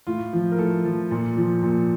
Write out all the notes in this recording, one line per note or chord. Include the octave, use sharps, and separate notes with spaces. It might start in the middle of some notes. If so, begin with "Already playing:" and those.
A2 F4
F3
A#4
A2 A4
F3
A#2
F3
A#2